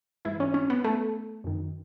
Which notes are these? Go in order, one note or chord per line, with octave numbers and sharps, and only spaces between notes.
G#2 E3 E4
C#4
C#4
B3
A3
F#2 D#3